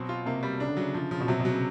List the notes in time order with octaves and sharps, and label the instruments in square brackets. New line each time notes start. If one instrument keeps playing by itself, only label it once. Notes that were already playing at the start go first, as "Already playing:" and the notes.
Already playing: [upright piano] B2 [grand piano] F#3 C4
[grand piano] F4
[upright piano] C3 [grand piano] A#3
[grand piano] G3
[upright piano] C#3 [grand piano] D4
[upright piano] D3
[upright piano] C#3 [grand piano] F#3
[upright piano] C#3 [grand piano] F3
[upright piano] C#3 [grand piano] F3
[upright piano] B2
[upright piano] C3 [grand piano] F#3
[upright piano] B2
[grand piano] F#3
[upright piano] C#3